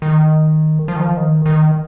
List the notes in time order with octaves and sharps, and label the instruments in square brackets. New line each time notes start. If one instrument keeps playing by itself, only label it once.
[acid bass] D#3
F3
D#3
F3
D#3
D#3